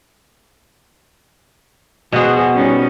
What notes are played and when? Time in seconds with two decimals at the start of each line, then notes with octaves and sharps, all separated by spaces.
2.12 B2 B3 F#4 G#4 C5
2.53 G3 C#4 D#4